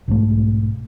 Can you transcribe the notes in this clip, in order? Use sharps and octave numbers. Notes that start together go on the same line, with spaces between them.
B1 G#2 A3